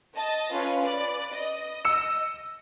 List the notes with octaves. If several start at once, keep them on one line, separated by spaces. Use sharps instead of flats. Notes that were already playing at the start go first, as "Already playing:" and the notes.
D#5 A5
C#4 F4 B4
B4 D5
D#5
E6 C#7 E7